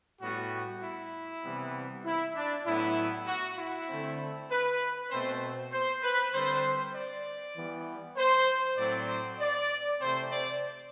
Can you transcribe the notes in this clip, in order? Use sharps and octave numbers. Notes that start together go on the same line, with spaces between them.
A2 G3 B3 F#4
E4
C3 E3 G3 B3
E4
D4
A2 F#3 B3 E4
F#4
E4
D3 A3 C4
B4
B2 A3 C4 C5
C5
B4
D3 G3 C4 C5
D5
E3 G3 B3
C5
A2 F#3 C4 D5
C5
D5
C3 E3 A3 C4 C5
D5